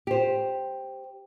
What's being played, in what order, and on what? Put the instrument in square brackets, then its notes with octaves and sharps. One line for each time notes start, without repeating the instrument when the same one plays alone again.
[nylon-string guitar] G4 C5